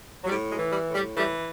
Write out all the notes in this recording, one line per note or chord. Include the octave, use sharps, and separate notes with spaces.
F#3
A2 G3
F#3 G#3
E3
G3
A2
G3
E3 G3 A3